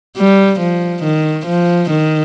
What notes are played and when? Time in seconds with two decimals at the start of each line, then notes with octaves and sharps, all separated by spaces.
0.17 G3
0.60 F3
1.03 D#3
1.46 F3
1.90 D#3